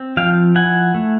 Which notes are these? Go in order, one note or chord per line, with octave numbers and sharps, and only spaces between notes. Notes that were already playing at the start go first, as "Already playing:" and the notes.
Already playing: C4
F3 F5 G5
E4 F#5 G#5
A3